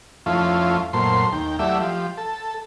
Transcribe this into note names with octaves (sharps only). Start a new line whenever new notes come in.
F2 F3 A3 C#4 E4 F4
F#2 A#2 A3 C5 C6
D#2 G5
F#3 A3 E4 G4 D5 E5
F3 G4
A4